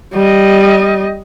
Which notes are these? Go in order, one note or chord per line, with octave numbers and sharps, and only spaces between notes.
G3 D#5